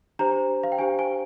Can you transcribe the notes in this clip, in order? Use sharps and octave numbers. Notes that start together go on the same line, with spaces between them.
D4 G4 C5 A#5
F5
G5
D4 G4 C5 G#5
G#5